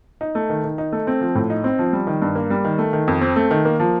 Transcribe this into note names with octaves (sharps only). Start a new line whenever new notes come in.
D#4
A3
D#3
D#3
D#4
A3
C4
F3
A2
D#4
C4
F3
G3
D#3
G2
A#3
G3
D#3
A3
D#3
F2
C4
A3
D#3
A#3
F3